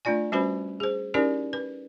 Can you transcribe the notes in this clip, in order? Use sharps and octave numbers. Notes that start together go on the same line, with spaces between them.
A3 D4 F4 D5 G#5
G3 C#4 F#4 B4 C5 B5
G#4 C5
C#4 D#4 E4 G4 A#4 D5
B4